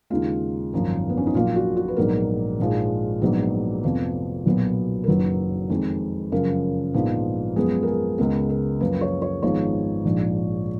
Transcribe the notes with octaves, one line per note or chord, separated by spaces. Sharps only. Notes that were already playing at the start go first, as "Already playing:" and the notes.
D#2 C#3 G#3 F4
G#1 F#2 F3 A#3
B3
C#4
D#4
A#1 A#2 F#3 A#3 F4
F#4
F#4
B4
A#1 G#2 F#3 B3 A#4
A#1 G#2 F3 G#3
A#1 G#2 F#3 B3
F1 F2 F3 B3
B1 A#2 F#3 B3
A#4
F#1 F#2 D#3 F#3 B4
F2 D#3 G#3
F#2 C#3 F3 A#4
A#1 G#2 F3 B3
F#2 F3 G#3 B3 G#4
A#4
G#4
C#2 C#3 G#3 B3 A#4
A#4
F#2 F3 A#3 B4
C#5
C#5
G#1 G#2 F3 G#3 B3 C#5
A#1 G#2 F3